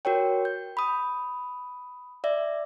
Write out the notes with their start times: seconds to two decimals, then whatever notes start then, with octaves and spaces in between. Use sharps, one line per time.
0.05 F#4 A#4 C#5 G5
0.45 G6
0.77 B5 D#6
2.24 D5 E5